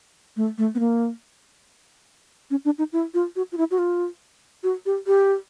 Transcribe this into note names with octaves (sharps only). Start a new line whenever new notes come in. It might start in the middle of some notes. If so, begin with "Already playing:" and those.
A3
A3
B3
A#3
C#4
D4
D#4
E4
F4
F#4
F4
E4
F#4
F4
F#4
G4
G4